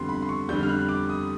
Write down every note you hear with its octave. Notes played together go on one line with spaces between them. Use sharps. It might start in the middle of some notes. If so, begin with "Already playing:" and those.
Already playing: F2 D3 G3 B3 C6
B5
C6
C#6
F2 D3 G3 B3 G6
F6
F#6
D6
D#6